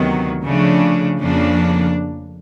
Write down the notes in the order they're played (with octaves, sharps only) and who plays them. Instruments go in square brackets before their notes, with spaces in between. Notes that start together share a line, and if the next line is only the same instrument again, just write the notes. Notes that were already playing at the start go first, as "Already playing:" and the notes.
Already playing: [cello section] D2 C3 D#3 F#3 B3
C#3 F3 A3 D4
F2 C#3 F3 A#3 D4